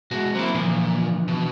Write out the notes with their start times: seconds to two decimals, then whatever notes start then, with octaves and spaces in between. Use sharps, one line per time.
0.11 B2 G#3 F#4
0.35 F#3 A#3 C4 E4
0.54 A#2 D3 E3 F3
1.28 B2